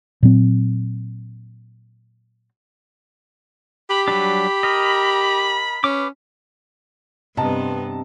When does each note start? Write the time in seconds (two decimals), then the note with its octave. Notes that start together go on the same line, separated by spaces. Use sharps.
0.23 A#2 F#3 C4
3.90 G4 B5
4.08 F#3 G3 D4 B5
4.63 A#4 D#5
5.84 C#4 B4 D6
7.37 G2 C3 B3 D#5 A5 A#5